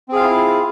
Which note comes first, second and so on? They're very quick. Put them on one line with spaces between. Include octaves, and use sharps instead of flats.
C4 G#4 F5 F4 E4